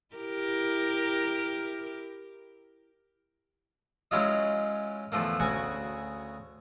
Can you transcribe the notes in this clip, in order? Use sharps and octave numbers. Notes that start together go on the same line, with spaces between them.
E4 G4 A#4
F#3 G#3 C#4 E4 F4 D#5
E2 D3 F3 A3 A#3
D2 C#3 F#4 G#5 C#6